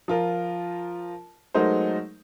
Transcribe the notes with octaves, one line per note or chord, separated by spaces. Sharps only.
F3 F4 A#4
F#3 G#3 A3 D#4 A#4 C5